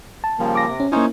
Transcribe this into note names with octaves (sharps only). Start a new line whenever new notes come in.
A5
C#3 F3 G3 A#3
D6 A#6
C3
C#4
A#3 C#4 D#4 E4 C5 C#5